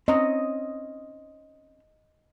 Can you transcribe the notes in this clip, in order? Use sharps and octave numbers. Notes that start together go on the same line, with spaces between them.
C4 C#4 D#5 A#5